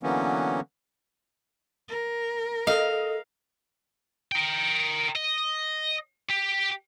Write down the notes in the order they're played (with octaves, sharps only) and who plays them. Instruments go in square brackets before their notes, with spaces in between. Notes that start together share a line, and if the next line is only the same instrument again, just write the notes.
[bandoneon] D3 E3 F#3 A#3 B3 C#4
[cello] A#4
[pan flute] A4 [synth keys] D#5 [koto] F5
[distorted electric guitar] A#4 G5
D#5
G4